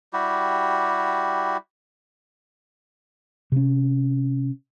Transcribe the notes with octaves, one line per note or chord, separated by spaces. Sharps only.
G3 E4 F#4 G4
C3 C#4